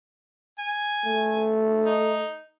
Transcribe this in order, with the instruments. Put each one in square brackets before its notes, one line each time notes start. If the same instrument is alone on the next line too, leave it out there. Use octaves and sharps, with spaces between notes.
[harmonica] G#5
[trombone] A3
[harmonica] D#4